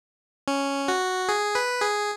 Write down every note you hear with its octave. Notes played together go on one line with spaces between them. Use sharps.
C#4
F#4
G#4
B4
G#4